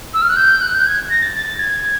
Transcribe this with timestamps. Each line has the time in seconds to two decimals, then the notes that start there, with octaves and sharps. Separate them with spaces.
0.14 E6
0.22 F6
0.29 F#6
0.36 G6
0.62 F#6
0.74 G6
0.86 G#6
1.10 A#6
1.22 A6
1.35 A6
1.47 A6
1.59 G#6